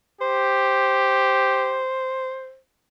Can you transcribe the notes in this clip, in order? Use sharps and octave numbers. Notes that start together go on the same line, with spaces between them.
G4 C5